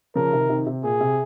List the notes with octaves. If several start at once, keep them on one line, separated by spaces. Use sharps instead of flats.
C#3 F3 A#4
C3 D#3
C3 D#3
C3
A#2 G#4
C3